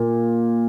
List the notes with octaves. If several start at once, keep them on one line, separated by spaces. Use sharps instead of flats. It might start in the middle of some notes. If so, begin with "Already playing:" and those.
Already playing: A#2